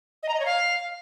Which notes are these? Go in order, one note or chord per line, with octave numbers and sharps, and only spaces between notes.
D#5
A#5
D#5
C#5
F5